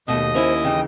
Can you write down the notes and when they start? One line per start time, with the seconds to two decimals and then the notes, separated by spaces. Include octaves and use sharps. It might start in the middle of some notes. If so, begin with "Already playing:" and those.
0.08 D#2 B2 A3 D#5 D#6
0.35 A#3 C#4 E4 C5
0.65 C#3 E3 D#4 G5